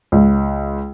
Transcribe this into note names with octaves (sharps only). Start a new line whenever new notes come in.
C#2